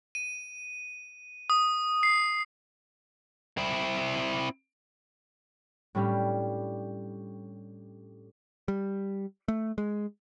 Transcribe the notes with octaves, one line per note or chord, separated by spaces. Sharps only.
D#7
D#6
C7
C4 E4
A2 G3 C#4 D4 G4
G3
A3
G#3